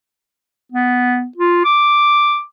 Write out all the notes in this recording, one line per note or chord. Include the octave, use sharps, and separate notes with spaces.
B3
F4
D6